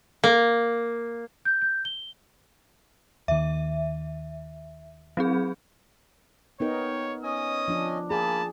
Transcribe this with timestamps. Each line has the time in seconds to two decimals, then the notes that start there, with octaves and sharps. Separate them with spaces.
0.24 A#3
1.45 G6
1.62 G6
1.85 G7
3.28 D#2 D#3 E5
5.17 F#3 C4 G#4
6.60 B3 D#4 A#4 C#5 G5
7.23 C#4 D#5 G#5 D#6
7.68 F3 D4
8.11 A#3 G#4 G#5 A5 B5